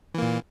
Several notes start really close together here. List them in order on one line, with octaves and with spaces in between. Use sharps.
E3 A#3 A#2